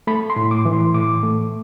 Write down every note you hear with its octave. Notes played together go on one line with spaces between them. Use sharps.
A3 B5
C6
A2
D6
E3
C6
A2 D6
A3